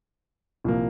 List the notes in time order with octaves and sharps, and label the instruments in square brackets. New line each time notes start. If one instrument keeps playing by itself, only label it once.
[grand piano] C2 A#2 F3 A#3